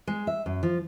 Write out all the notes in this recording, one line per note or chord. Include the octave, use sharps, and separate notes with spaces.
G#3
E5
F#2
F3